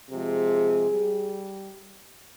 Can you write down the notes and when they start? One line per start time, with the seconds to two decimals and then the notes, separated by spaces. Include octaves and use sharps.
0.11 C3 F3 G#3 G#4
0.90 G3